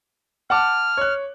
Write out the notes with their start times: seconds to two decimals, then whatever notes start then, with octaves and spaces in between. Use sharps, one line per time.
0.50 F#5 A5 D6 F6
0.97 C#5 F#6